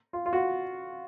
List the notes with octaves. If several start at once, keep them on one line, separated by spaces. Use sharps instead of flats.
F4
F4
F#4